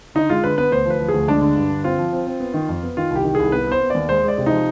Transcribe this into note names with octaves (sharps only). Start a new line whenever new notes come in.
D3 D#4
G#3 F4
D3 B4
B3 B4
D2 C5
F3 B4
F3
G#4
D2
G#3 D4
D3
G2
D3
C4 F4
F3
C4
C4
B3
D#3
F2
B3
D#3 F4
C2 G4
D#3
C2 G#4
B3 B4
B3
C5
B3
D#2 D5
G#3 C5
G#3 D5
C3
F3 D#4